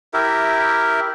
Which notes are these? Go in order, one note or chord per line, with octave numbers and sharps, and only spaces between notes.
E4 G4 A#4 E5